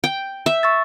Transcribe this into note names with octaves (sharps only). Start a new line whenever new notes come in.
G5
E5
C#6 E6 A6